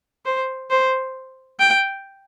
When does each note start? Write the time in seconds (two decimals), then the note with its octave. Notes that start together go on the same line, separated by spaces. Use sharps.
0.25 C5
0.70 C5
1.60 G5